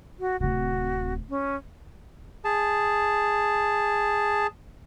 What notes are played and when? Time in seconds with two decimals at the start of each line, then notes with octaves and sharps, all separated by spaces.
0.20 F#4
0.40 D1 C3 F#4
1.30 C#4
2.45 G#4 A5